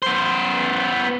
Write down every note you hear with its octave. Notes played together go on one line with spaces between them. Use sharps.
B3 C5